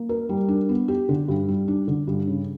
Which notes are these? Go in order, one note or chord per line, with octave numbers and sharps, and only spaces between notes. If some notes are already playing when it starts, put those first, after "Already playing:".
Already playing: A#3
A#4
G3
D4
B3
G4
D3
G2
G3
D4
D3
G2
C#3